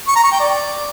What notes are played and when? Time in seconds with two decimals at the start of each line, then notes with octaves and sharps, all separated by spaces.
0.08 C#6
0.16 A#5
0.24 C#6
0.32 G5
0.40 D5